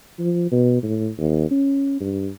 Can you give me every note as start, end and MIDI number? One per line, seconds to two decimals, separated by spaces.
0.19 0.51 53
0.52 0.81 47
0.83 1.09 45
1.18 1.49 39
1.51 1.98 61
2.00 2.30 43